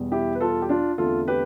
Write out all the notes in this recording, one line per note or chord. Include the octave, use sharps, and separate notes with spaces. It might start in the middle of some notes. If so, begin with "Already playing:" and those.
Already playing: E2 B2 G3
E4 G4
B4
F4 A4
G4
D4 F4
E2 D3 A3 C4 F4 A4
G4 B4